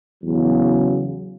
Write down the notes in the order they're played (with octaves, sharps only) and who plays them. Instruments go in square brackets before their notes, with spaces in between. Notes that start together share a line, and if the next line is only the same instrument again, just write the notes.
[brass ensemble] E2 C#3 F#3